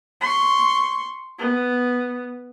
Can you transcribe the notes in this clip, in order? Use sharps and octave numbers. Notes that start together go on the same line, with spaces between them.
C6 C#6
B3